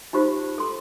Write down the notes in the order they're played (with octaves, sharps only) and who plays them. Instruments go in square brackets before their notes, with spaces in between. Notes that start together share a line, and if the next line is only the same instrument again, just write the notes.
[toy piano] D#4 F4 G4 C5
A4 C6